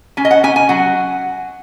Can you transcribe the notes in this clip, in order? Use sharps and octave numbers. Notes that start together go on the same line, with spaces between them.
C#4 G#5
D#5
F#5
C#4 G#5
G#5
F#3 F#5